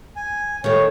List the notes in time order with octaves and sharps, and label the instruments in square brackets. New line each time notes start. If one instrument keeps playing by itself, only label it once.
[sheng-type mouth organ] G#5
[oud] D#3 A3 [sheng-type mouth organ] C#5